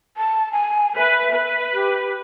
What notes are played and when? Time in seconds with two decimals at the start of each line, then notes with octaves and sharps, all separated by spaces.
0.17 A5
0.52 G#5
0.97 B4 E5
1.33 B4
1.74 G4